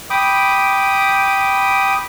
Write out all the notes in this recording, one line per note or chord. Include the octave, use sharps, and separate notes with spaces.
G5 B5 D6 D#6